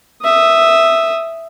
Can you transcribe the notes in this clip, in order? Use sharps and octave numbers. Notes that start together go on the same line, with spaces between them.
E5 D#6